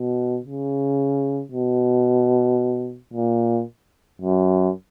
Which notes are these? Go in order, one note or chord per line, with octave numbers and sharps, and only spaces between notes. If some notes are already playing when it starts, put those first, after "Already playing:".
Already playing: B2
C#3
B2
A#2
F#2